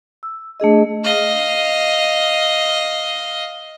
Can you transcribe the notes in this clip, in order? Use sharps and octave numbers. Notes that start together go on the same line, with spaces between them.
E6
A3 D4 G#4 D#5
D#5 F5